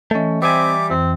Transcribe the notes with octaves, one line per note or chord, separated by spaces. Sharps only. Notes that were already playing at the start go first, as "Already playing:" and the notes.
E3 A3 C#4 D#5 A6
G3 C4 E5 G#5 D6
F2 E3 C4